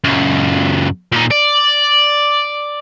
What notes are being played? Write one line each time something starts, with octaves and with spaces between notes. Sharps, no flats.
C#2 F#2
A#2 D#4
D5